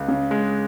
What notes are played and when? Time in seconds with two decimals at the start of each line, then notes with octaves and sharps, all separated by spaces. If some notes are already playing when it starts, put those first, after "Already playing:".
Already playing: C#2
0.08 C#3
0.31 G#3